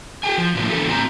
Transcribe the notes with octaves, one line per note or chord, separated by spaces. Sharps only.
G#4 G5 G#5
F3
A2 F3 A#3
D3 E3 G4 A4
A2 C4 C5 A5 A#5